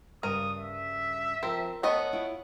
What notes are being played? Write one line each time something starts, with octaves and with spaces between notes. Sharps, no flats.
G2 C#3 A#4 D#6
E5
F3 C4 A#4
A3 B3 C#5 D#5 F#5
E4 F4